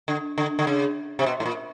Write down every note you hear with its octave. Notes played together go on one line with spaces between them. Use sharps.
D3
D3
D3
C#3
C3
B2
A2
A#2